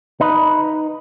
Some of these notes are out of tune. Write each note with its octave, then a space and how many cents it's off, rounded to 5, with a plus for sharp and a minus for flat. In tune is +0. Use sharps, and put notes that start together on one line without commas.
D#4 +0 B4 +0